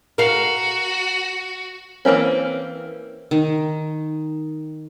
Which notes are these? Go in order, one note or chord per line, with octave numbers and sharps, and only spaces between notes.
F#4 A#4 F5
E3 A#3 C4 C#4
D#3